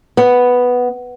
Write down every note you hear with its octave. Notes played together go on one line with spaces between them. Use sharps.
B3